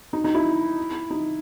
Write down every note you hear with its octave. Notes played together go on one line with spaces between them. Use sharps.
D#4
D#4
E4
D#4